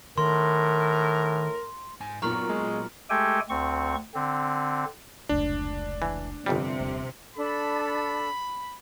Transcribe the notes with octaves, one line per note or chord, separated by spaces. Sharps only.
A2 D#3 A#4 C6
G#2 G#5
A#2 F#3 B3 A#4 A#5 C#6 F6 F#7
G#3
G#3 A3 G4 A4 G5 G#5
D2 C4 C#6
D3 C4
F1 C#2 D4
E3
G1 F2 C3 G3
D#1
D4 A4 B5